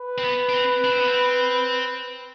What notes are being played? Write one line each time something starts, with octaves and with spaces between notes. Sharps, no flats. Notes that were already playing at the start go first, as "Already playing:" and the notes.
Already playing: B4
C4
B3
D4
C4
D4
C4
B3
C4